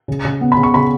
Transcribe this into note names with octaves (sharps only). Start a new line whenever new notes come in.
C#3
C#3
B3
B5
C#3
C#6
C#3 B5